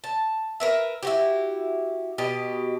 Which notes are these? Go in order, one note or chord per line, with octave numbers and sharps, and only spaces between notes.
A5
A#4 B4 E5
E4 F#4 G4
B2 G4 D#5